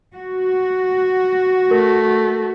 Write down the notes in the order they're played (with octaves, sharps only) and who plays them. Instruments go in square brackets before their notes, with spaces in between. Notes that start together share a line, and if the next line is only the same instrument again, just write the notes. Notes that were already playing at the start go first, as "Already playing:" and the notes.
[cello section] F#4
[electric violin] A3 [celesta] A#4